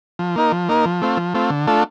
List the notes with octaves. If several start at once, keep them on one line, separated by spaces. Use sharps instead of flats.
F3
A#3 D#4 A#4
F3
A#3 D#4 A#4
F3
A3 C4 F4
F3
A3 C4 F4
D3
A3 D4 F4 A4